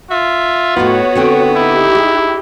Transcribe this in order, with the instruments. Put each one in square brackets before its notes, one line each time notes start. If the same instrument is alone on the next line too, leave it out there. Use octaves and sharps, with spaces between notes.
[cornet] F4 [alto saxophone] E5
[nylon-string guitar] A2 D#4 E4 [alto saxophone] B3 [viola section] F#4 C#5
[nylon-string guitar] D3 C4 G5
[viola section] D#4 G4 [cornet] E4
[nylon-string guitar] G#4